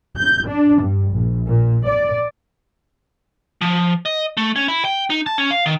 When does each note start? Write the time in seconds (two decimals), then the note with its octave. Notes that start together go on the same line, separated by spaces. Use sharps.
0.17 G6
0.47 D4
0.82 G2
1.12 A#1
1.47 A#2
1.85 D5
3.61 F3
4.06 D#5
4.37 A3
4.56 C#4
4.68 E4
4.85 G5
5.10 D#4
5.26 A5
5.38 C#4
5.51 F5
5.66 D#3